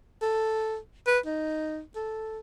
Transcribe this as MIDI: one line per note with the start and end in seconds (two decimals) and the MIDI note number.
0.22 0.77 69
1.07 1.19 71
1.26 1.81 63
1.96 2.39 69